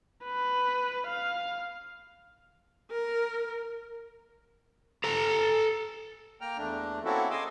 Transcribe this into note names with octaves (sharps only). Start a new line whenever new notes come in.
B4
F5
A#4
A4 A#5
A#3 G5 A#5 F6
E2 A3 D4
A#3 C4 C#4 E4 F#4 A4
G#4 D#5 G#5 C6 D6 E6